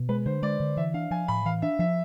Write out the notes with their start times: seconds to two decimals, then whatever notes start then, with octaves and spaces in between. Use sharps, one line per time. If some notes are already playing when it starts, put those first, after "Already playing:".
Already playing: B2
0.09 G#3 B4
0.26 D3 C5
0.42 G#3 D5
0.60 D3
0.77 E3 E5
0.94 D4 F5
1.11 F3 G#5
1.28 A2 B5
1.45 E3 F5
1.62 D4 E5
1.79 F3 E5